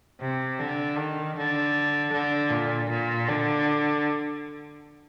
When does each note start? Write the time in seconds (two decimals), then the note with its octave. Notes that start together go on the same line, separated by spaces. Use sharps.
0.21 C3
0.59 D3
0.98 D#3
1.36 D3
2.13 D3
2.50 A#2
2.89 A#2
3.28 D3